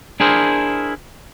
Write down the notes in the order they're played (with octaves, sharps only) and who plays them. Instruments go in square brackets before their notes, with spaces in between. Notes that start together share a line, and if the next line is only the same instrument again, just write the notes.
[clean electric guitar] D4 E4 G#4 A#4 C5